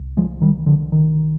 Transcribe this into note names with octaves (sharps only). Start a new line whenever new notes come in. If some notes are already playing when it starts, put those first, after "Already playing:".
Already playing: C2
F3 G#3
D#3 G3
D3 F3
D#3